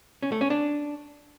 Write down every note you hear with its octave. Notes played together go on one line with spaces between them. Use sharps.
C#4
A3
C#4
D4